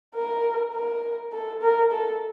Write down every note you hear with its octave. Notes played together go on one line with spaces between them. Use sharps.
A#4
A#4
A4
A#4
A4